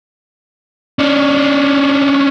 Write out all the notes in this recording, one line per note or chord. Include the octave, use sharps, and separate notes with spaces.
C#4 D4